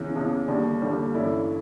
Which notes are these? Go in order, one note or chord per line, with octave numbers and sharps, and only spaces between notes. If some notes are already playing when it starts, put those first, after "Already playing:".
Already playing: E2 C#3 E3
E2 C#3 E3
D#2 D3 G3
D#2 D3 G3
G2 E3 A3 C#4 E4